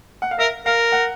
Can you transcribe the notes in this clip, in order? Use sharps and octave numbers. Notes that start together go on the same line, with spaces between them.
F#5
F5
A#4 E5
A#4 F5
F#5